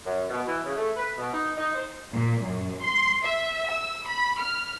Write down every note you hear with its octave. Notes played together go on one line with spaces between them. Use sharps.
F#2
B2
E3
C#3
A3
B4
B2
D#4
D#4
C5
A#2
F#2
C6
E5
E6
B5
F6